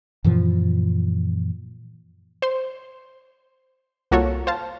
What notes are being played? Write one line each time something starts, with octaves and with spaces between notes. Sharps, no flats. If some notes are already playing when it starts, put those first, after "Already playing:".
F#2 A#2 E3 F3
C5 C6
C2 A#3 F4 F#4 A4 C#5
C5 F5 A5